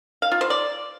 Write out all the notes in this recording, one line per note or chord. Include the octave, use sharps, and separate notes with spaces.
F5
F4
C5
D5